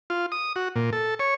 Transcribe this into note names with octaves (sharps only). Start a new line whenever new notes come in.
F4
D#6
F#4
A#2
A4
C#5